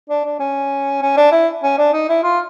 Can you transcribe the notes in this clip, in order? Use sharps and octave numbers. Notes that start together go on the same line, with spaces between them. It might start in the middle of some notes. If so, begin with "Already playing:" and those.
D4
D4
C#4
C#4
D4
E4
C#4
D4
D#4
E4
F4